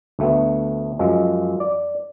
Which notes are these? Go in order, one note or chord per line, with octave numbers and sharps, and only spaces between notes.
D2 A3 B3
F#2 F3 G#3
D5